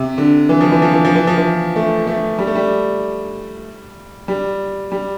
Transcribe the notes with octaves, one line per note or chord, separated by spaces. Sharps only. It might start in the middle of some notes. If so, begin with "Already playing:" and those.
Already playing: C3
D3
E3
F3
E3
F3
E3
F3
E3
F3
E3
A3
A3
G3
A3
G3
G3
G3